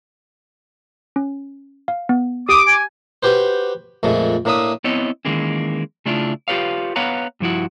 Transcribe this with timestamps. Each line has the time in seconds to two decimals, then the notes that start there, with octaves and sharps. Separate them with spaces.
1.16 C#4
1.88 F5
2.09 B3
2.49 G4 D6 D#6
2.68 G#5
3.23 F#4 G4 B4 C5
4.03 F2 A#2 G#3 A3
4.45 A2 A#3 D4 E5 D#6
4.84 B3 C4 E4 C#5 D#5
5.25 D#3 E3 G#3 A#3 C#4
6.05 C#3 A3 D4 E4 F4
6.48 F4 G4 B4 C#5 F5
6.96 B3 B4 C#5 F5 F#5 A#5
7.40 G2 F3 E4 F#4